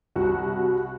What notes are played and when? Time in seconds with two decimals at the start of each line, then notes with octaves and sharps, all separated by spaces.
0.16 C2 F#4
0.46 C3